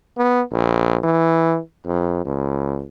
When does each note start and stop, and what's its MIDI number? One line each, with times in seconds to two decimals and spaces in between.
0.17 0.41 59
0.51 0.96 34
1.03 1.58 52
1.85 2.23 41
2.25 2.86 37